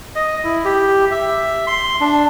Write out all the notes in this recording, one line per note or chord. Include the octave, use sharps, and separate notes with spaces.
D#5
E4
G4
E5
C6
D4